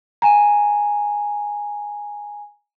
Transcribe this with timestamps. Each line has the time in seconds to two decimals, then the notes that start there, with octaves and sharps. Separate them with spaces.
0.22 G#5 A#5